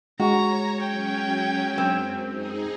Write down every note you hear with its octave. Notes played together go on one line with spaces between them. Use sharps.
G#3 F#4 C#5 A#5
F#3 C#4 G5 G#6
F#2 C4
D#4 G#4